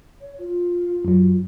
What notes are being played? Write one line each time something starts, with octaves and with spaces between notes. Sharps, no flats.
C#5
F4
F#2 F#3